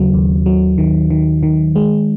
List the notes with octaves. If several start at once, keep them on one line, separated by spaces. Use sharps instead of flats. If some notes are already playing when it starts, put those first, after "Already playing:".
Already playing: D#2 C#3 F#3
D#2
F#3
D#3
D#3
D#3
G#3